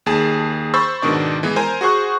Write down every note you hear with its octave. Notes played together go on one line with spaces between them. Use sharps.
D#2 G#4 A5
C5 B5 C#6 E6 A6
G#2 B2 D#3 D4 D5
E3 G#3 B3
A#4 C5 G#5 A#5
F#4 G#4 C5 C#6 F#6